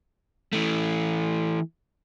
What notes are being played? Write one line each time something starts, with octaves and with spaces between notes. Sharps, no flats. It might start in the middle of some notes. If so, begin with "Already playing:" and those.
E3 A3